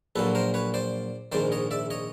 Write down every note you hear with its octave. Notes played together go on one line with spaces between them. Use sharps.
A#1 A#2 F#3 A4 B4
A#4 C5
B4 C#5
C5 D5
A#1 G#2 D#3 C5 D5
C#5 D#5
D5 E5
C#5 D#5